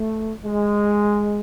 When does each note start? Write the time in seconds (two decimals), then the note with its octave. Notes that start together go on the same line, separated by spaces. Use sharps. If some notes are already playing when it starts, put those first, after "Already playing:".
Already playing: A3
0.43 G#3